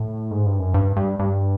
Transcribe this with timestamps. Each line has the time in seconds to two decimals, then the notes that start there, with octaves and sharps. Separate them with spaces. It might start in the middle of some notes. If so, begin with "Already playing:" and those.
Already playing: A2
0.31 G#2
0.46 G2
0.59 F#2
0.74 G2
0.97 G2
1.19 G2